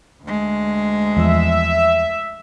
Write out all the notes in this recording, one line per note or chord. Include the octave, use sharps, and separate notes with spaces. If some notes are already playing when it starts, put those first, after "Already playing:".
D2 G#3
E2 F3 E5